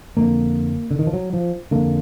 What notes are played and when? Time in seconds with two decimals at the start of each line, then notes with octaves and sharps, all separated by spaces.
0.17 F2 D3 A#3
0.91 D3
0.99 D#3
1.07 F3
1.13 F#3
1.33 F3
1.71 F2 D3 A#3